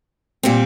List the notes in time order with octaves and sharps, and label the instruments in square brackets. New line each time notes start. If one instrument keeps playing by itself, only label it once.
[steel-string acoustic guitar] A#2 G3 C4